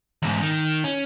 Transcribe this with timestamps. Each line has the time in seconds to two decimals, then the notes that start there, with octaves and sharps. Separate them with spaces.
0.22 E2 G#2
0.41 D#3
0.84 C#4